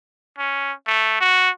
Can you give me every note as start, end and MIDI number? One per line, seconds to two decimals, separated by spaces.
0.38 0.73 61
0.87 1.17 57
1.21 1.50 66